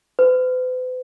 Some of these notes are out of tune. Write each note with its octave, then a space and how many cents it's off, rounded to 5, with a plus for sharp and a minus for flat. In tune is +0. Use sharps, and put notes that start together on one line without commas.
B4 +45